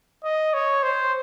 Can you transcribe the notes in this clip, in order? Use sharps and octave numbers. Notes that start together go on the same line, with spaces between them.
D#5
C#5
C5